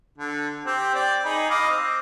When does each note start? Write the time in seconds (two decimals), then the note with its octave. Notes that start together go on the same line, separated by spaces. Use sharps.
0.18 D3
0.65 C4 G4
0.95 D5 G5
1.25 D#4 G#4 B5
1.50 D#5 F5 D6
1.70 C4